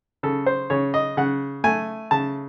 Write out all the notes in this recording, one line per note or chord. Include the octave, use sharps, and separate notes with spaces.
C#3 A4
C5
C#3 C#5
D#5
C#3 F#5
A3 G#5
C#3 A5